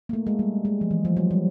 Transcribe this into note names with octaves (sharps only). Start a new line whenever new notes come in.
A#3
A3
G#3
G3
G#3
F3
E3
F3
F#3
G3